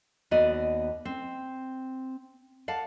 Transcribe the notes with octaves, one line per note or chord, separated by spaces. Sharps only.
D#2 B3 F#4 D5 D#5
C4
D5 F5 F#5 A5